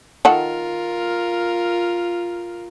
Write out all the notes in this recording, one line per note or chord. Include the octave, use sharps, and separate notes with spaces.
D#3 F4 A4 A#4 F#5